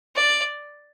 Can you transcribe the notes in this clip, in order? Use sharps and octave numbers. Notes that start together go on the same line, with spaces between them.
D5